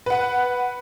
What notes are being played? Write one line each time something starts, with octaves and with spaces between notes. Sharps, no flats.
B4 F#5